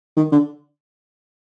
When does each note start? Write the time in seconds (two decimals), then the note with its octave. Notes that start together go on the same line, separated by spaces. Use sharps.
0.17 D#3
0.32 D3